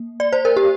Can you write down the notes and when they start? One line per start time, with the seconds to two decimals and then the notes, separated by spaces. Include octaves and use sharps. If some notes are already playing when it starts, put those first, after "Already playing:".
Already playing: A#3
0.20 D5
0.33 C5
0.45 A#4
0.57 G4